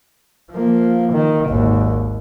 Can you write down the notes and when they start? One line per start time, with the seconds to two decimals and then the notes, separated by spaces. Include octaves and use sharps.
0.52 F3 A#3
1.13 D#3
1.50 G#1 D#2